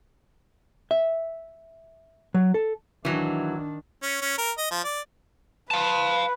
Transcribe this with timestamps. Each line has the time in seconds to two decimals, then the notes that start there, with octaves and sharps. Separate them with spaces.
0.91 E5
2.34 F#3
2.54 A4
3.05 D#3 E3 F#3 D4
4.03 C#4
4.22 C#4
4.38 A#4
4.58 D#5
4.71 F3
4.84 D5
5.71 B4 F5 A5